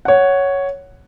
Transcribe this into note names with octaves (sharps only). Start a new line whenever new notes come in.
C#5 F#5